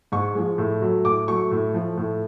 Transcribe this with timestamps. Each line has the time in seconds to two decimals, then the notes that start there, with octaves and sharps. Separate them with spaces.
0.12 G#2 C#6
0.35 F3 G#3
0.58 A2
0.82 F#3 A3
1.05 A2 D6
1.28 F#3 A3 C#6
1.51 A2
1.74 F3 A3
1.98 A2